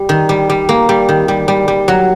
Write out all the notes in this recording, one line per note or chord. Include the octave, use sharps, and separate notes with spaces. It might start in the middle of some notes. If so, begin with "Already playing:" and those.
Already playing: G3
D#3
G3
G3
A#3
G3
D#3
G3
G3
G3
F#3